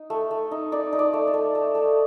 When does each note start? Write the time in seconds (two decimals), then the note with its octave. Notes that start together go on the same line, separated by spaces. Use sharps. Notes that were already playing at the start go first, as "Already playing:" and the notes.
Already playing: D#4
0.10 A3
0.31 A3
0.51 D#4
0.72 D#4 D5
0.93 D#4
0.99 D5
1.13 A3
1.27 D5
1.34 A3
1.55 A3
1.75 A3